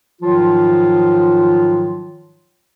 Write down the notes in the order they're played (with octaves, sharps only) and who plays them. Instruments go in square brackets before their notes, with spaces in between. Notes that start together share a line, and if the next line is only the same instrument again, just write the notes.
[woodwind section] G#2 D#3 F3 F#3 F4